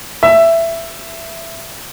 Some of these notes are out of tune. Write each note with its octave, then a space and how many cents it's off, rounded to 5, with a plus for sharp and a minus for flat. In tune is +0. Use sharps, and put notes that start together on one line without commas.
E5 +10